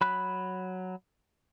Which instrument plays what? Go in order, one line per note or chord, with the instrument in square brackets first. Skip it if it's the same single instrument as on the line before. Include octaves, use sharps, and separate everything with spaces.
[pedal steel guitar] F#3 B5 F#6